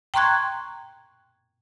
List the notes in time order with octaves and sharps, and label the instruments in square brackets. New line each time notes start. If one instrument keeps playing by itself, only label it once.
[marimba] G5 A#5 C6 C#6 F#6 G#6